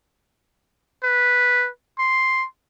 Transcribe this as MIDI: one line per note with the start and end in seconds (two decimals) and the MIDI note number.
1.04 1.69 71
1.99 2.46 84